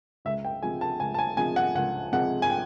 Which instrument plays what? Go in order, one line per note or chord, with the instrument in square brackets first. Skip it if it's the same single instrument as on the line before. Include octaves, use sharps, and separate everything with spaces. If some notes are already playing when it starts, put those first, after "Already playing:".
[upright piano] C#2 E5
G5
C3 F3 G#3 G#5
A5
C#2 G#5
A5
G#5
C3 F3 G#3 G#5
F#5
C#2 F#5
C3 F3 G#3 F#5
G#5
G5